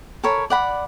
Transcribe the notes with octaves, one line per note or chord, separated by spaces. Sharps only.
A4 A#4 C#5 B5
D5 F#5 B5